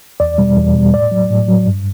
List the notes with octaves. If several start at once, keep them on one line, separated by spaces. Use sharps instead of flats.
E2 D5
B2 G3
E2
B2 G3
A2 D5
F#3
A2
F#3
G2